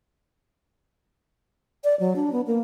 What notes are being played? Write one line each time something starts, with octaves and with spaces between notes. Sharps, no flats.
D5
F#3
D4
B3
A#3